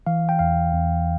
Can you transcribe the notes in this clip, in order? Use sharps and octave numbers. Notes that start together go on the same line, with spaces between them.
E3 F5
G5
E2 F5
E2